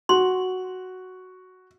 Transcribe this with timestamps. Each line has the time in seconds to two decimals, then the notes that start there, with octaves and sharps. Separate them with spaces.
0.09 F#4 C6